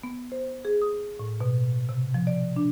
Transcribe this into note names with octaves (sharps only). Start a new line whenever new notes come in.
B3
C5
G#4
D#6
A2
B2
C3
F3
D5
D4